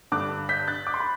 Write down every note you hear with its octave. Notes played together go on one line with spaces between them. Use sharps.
G2 D3 D6 F#6
G6 B6
F#6 A6
D6
C6
B5